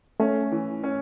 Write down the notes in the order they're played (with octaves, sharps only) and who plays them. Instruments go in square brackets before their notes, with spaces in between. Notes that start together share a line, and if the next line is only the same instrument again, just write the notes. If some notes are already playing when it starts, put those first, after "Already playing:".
[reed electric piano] A3 [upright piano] C#4
[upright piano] E3
C#4